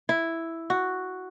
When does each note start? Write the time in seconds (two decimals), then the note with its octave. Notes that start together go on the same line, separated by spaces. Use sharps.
0.09 E4
0.70 F#4